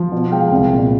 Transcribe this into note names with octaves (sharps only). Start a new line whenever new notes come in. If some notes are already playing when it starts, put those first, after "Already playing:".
Already playing: F3
B2
G#3 F5 G5
C2
A#2